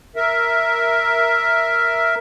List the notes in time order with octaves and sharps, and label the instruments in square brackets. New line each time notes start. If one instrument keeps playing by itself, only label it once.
[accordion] A#4 E5